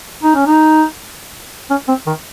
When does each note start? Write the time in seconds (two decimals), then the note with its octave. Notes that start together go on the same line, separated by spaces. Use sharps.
0.23 D#4
0.35 C#4
0.46 D#4
1.70 C#4
1.88 C4
2.07 D#3